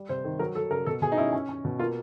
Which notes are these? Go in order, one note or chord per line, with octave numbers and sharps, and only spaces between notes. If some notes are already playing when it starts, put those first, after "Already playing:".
Already playing: G3
C3 C5
D#3
F#3 A#4
F#3 A4
C#3 A#4
B2 A4
B2 G#4
D#4
C#4 E4
C#4
C#4
B2
A#3 F4